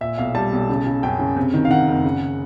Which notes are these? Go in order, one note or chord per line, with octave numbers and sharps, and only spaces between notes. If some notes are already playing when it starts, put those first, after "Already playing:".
A#2 E5
B1 F5
G3 A5
B1
C#3
C#3
F#2 G5
C#3
C3
D#3
F5
D#3 F#5
F#1
C#3